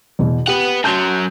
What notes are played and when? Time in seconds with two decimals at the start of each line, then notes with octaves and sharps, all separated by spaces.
0.19 E2 B2
0.47 G4 B4 F#5 G5
0.84 F#2 F#3 A5 C6 G6